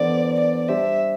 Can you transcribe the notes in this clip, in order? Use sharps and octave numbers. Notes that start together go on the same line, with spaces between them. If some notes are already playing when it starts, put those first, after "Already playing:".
Already playing: E3 B3 D4 A4 C5 D5
D5
G3 D4 G4 C5 E5